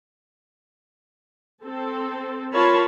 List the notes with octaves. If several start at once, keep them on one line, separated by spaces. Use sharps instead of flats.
C4 A4
F4 A#4 C#5 A5 B5